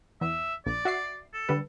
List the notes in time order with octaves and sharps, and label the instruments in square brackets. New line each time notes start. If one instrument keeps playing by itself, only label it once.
[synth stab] E2 [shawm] E5
[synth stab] A#1 [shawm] D5
[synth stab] F#4 E5 C7
[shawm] A4
[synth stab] D3 G3 B4